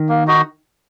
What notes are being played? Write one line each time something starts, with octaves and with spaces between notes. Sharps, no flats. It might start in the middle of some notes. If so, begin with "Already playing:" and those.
Already playing: D#3
A#3
D#4 F#4 D#5